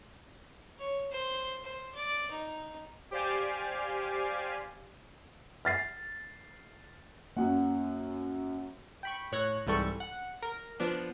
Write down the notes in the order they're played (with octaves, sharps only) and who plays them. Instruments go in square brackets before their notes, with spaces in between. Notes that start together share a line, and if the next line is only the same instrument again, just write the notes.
[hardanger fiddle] C#5
C5
C5
D5
D#4
[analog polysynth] G4 C5 D5 F5 G#5
[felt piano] F6 A6 C7
[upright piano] F#2 F#5 [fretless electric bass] A#3 B3 C#4
[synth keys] G5 B5 C#6
A2 C#5 F#6 G#6 A#6 C#7
C2 G#2 E3 G3 A4 C#6
F#5
A#4
F3 B3 D4